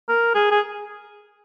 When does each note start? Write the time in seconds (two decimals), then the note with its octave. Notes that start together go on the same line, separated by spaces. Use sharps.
0.09 A#4
0.35 G#4
0.51 G#4